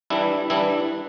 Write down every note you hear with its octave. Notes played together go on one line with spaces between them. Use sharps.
E3 G3 D4 E4
E3 G3 D4 E4